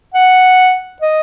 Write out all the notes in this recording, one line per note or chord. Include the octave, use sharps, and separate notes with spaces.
F#5
D#5